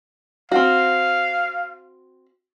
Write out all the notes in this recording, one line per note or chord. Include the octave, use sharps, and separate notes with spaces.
C4 F#4 F5